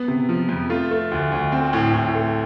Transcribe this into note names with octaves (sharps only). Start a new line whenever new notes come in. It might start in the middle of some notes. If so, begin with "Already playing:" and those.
Already playing: B3
C3
F3
F2
A3 F4
A3
D2
D2
C4
A2
A2
A3